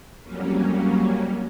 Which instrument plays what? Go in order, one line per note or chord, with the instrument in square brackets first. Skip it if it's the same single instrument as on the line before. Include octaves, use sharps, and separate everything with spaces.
[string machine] F2 F#3 G3 A#3 C#4